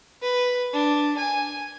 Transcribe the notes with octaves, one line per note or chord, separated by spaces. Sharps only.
B4
D4
G#5